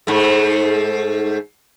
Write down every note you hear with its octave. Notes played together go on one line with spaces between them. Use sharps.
G#2 A3